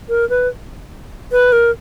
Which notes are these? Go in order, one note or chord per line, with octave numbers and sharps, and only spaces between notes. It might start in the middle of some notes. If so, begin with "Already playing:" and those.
A#4
B4
B4
A#4